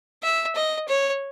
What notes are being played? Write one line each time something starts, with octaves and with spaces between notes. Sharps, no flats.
E5
D#5
C#5